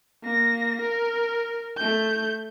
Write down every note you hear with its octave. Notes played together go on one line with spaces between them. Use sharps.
A#3 A#6
A#4
A3 G6